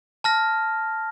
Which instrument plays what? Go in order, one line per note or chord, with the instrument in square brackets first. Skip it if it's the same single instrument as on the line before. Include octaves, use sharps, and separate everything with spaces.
[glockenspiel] A5 F6 A#6